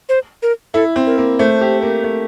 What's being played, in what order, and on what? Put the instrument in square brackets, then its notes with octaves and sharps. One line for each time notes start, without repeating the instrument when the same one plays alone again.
[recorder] C5
A#4
[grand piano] E4 [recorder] A4
[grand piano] C4
[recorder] A#4
[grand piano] A#3
[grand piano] A3 [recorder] C5
[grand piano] G4
A#3
A3